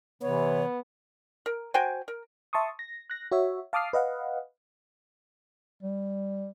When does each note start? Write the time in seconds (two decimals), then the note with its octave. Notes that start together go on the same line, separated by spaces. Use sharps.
0.22 C3 E3 B3 C#5
1.46 A#4
1.74 F#4 C5 G5 G#5
2.08 A#4
2.53 E5 A5 C6 C#6 D#6
2.79 A#6
3.10 F#6 A#6
3.32 F#4 C#5 E5
3.73 F5 A5 D6 D#6 F6 C7
3.93 B4 D#5 F5 F#5
5.83 G3